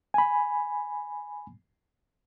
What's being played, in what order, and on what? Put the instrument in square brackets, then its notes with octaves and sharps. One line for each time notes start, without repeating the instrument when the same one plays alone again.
[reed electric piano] G#5 B5